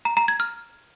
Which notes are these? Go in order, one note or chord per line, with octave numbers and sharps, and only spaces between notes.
A#5
A#5
G#6
F6